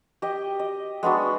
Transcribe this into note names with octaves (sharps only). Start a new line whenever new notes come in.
G4 D#5
D#5
G#3 B3 D4 F#4